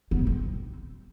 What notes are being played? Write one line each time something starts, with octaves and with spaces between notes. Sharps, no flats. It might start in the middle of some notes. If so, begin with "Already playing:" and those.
B3
A#2
C4